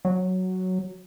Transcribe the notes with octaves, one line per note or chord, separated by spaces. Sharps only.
F#3